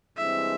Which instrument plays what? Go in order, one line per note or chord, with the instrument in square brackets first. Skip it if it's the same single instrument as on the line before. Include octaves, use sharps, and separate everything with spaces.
[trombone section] G2 E3 G#3 C4 [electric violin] E5